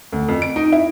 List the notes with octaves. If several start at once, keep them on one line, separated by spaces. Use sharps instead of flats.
D2
F2
D7
D#4
E4